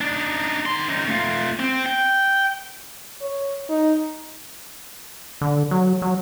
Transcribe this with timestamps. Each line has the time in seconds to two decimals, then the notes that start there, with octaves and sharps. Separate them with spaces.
0.01 D4 D#4
0.66 D#3 C6
0.89 C#4 D#4
1.08 A3 F4
1.60 C4
1.86 G5
3.22 C#5
3.70 D#4
5.41 D3
5.71 F#3
6.02 F#3